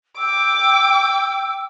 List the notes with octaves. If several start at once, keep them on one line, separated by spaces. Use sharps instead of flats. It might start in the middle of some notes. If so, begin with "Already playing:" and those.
G5 D6 E6